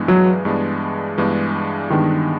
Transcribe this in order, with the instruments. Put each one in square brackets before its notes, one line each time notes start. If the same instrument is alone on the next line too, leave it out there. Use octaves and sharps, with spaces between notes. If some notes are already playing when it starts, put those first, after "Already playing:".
Already playing: [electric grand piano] G2 E3 G#3 B3 D4
[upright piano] F#3
[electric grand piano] G2 E3 G#3 B3 D4
G2 E3 G#3 B3 D4
[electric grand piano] G2 E3 G#3 B3 D4 [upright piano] D#3